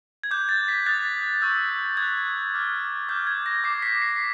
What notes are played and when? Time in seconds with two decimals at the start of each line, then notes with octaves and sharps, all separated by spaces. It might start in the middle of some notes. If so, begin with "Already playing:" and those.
0.23 G#6
0.31 D6 F#6 G6
0.49 A6
0.68 B6
0.86 D#6 F#6 A6
1.42 C#6 E6 G6
1.97 D#6 G#6
2.02 F#6
2.54 D6 F6
3.09 D6 F6 G6
3.27 G#6
3.46 A#6
3.64 D6 G6 C7
3.82 B6
4.02 C7